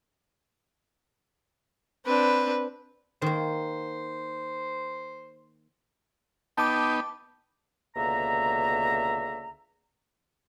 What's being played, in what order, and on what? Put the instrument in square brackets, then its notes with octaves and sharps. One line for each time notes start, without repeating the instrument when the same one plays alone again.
[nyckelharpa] C4 D4 [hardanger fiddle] B4
[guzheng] D#3 A#3 [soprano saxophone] C5
[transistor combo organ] B3 D#4 [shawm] G5 [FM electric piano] A5 D6
[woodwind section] C#2 B2 D3 A#3 E5 A#5